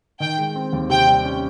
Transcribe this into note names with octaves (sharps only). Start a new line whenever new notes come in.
D#3 G5
G#3
C4
D#2
C3 G5
G3
C#4